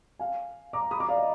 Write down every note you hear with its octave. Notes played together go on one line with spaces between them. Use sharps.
F5 G#5
A#5 D6
B5 D#6
A#5 D6
D5 F5
D#5